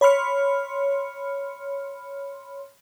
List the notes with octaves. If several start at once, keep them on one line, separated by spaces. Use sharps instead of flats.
C#5 B5 C6 F6 C#7